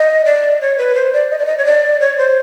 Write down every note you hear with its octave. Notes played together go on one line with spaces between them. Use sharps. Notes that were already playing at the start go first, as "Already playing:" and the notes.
Already playing: D#5
D5
C#5
B4
C5
D5
D#5
D5
D#5
C#5
D5
C#5
C5